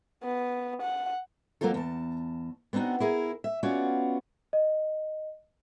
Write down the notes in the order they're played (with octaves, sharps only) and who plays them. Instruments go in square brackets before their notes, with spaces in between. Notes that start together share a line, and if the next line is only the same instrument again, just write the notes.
[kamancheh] B3
F#5
[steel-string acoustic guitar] F2 F#3 A#3 C4 F4 A4
E2 A5
B3 C4 D4 D#4 F#4
E4 G#4 A#4
E5
B3 C#4 F4 F#4 D5
[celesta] D#5